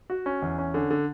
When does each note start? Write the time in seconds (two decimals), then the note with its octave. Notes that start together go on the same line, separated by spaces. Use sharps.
0.10 F#4
0.26 C#4
0.42 E2
0.58 C#4
0.74 D3
0.90 D3